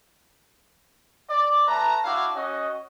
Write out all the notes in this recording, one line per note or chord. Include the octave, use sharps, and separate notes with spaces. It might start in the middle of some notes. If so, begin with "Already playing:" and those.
D5
A3 B4 A5 A#5
D4 E4 F#4 F5 D6
C#4 F#4 D#5